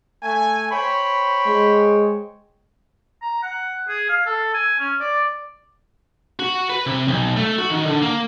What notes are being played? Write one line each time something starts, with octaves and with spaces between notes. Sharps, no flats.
A3 G#5
C5 C#5 G5 B5
G#3
A#5
F#5
G#4
F5
A4
G#5
C#4
D5
F#4
B4
C3
B1
A3
F#4
D#3
D3
A#3